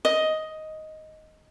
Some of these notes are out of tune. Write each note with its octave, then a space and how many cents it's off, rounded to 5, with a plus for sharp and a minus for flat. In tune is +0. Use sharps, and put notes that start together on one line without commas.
D#5 +5